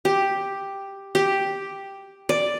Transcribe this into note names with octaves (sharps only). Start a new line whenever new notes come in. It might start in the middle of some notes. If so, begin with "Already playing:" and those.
G4
G4
D5